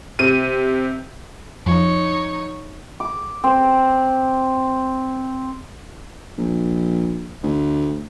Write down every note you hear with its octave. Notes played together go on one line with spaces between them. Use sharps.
C3 D#7
F2 D#4 C#5
D6
C4
A#1
D2